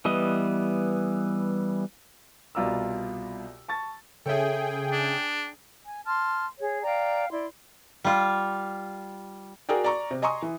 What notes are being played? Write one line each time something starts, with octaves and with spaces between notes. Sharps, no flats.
E3 G3 B3 D#5
C2 B2 F4 D5 A#5 E6
A5 C#6 A6
C#3 G#4 A4 C#5 E5 G5
D4
G#5
A5 C6 F6
G#4 C#5
D5 F5 G5 A#5
E4 D5 C6
G3 F4
F#4 G#4 A#4 D5 G5
D5 A#5 C#6
C3
D#5 G#5 A#5 C6 C#6 D#6
E3